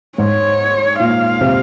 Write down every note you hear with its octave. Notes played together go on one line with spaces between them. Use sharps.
G#2 C#5
A#2 F5
C3